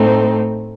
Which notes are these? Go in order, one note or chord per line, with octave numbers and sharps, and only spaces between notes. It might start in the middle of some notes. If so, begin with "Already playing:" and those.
Already playing: A2 A3 C4 D#4